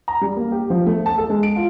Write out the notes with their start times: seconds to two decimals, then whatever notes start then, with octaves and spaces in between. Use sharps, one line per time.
0.08 A#5
0.21 G3
0.37 A#3
0.52 G4
0.70 F3
0.87 A3
1.06 A5
1.18 A4
1.30 G#3
1.43 D7
1.56 F4